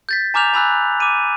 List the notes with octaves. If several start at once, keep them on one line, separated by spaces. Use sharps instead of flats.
G6 A6 B6
G#5 A#5 D6 F6 G6 F7
G#5 B5 E6 F#6
D6 D#7